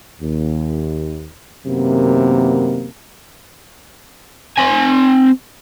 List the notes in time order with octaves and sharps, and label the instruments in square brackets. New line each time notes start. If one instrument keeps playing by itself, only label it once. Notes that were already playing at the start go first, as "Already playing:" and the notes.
[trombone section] D#2
F#2 C3 D#3 A#3 B3
[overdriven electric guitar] C4 G#5